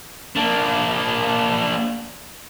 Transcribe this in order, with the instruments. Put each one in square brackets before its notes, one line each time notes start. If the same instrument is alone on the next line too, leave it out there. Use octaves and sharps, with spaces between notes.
[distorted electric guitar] A#3 D4